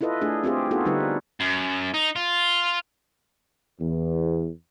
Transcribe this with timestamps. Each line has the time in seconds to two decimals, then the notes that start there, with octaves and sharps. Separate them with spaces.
0.01 E4 F4 A4 B4 D#5
0.21 A3 D4 G#4
0.44 C4 F4 G4 G#4
0.71 B3 D#4 F4 F#4 G#4 A4
0.85 D3 G3 D#4 F4 B4
1.40 F#2
1.94 D#4
2.16 F4
3.80 E2